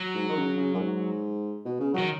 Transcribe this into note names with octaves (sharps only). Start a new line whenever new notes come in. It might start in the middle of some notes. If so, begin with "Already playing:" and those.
Already playing: F#3
G#2
D#3
C#3
C#3
F#2
G#2
B2
C#3
D#3 F#3